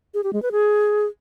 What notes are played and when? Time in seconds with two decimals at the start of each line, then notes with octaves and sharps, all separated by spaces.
0.14 G#4
0.24 G4
0.33 G#3
0.43 B4
0.52 G#4